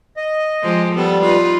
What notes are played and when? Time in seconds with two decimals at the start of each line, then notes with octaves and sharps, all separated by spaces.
0.17 D#5
0.63 F3 G#3 G4
0.95 G3 B3 A4
1.24 D#4 F4 B4